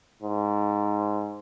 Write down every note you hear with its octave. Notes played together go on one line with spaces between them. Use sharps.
G#2